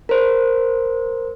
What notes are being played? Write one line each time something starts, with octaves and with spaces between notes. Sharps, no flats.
A#4 C5